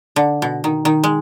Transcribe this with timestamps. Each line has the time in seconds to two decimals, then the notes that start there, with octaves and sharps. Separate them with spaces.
0.16 D3
0.42 B2
0.64 D#3
0.85 D#3
1.04 G#3